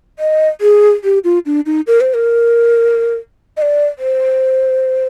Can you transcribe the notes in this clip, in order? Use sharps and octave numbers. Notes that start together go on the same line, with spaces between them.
D#5
G#4
G4
F4
D4
D#4
A#4
C5
A#4
D#5
D5
C5